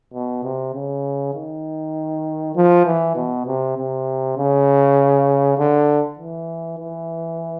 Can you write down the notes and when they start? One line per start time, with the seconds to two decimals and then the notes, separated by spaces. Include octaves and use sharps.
0.14 B2
0.43 C3
0.74 C#3
1.34 D#3
2.55 F3
2.86 E3
3.16 B2
3.46 C3
3.77 C3
4.37 C#3
5.58 D3
6.19 E3
6.79 E3